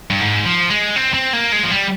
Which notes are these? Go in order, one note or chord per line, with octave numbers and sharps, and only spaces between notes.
G2
G#2
F3
G#3
C4
C4
A#3
G#3
F3
G3